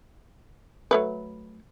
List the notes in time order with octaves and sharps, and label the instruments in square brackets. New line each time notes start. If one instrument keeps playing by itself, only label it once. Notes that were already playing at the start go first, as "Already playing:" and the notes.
[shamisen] F#3 A3 B4